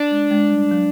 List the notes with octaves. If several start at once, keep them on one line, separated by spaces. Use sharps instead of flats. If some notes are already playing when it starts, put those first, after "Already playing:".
Already playing: D4
G#3
G#3
G3
F#3